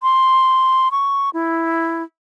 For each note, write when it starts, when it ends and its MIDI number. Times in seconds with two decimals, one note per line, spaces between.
0.03 0.88 84
0.92 1.30 85
1.34 2.03 64